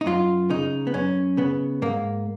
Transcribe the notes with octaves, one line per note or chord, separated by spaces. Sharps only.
D#4
F#2 F4
C#3 D#4
B3
F#2 C#4
C#3 B3
G#2 A#3